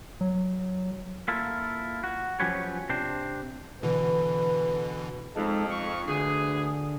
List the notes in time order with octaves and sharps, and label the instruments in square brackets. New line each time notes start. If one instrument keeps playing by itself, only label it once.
[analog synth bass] F#3
[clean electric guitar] A#3 E4 F4 A4
F#4
F3 F#3 C#4 G4 B4 C#5
C3 C4 D4 C5
[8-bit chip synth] B2 D3 E3 [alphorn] B4
[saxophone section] F2 [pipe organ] G#3 D#4 A4
[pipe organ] C#6
[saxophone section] D2 B3 G#4 [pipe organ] D3